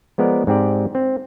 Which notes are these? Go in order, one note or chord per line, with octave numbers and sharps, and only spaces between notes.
F3 G#3 B3 A#4 D5
G#2 C4 G4 D5
C4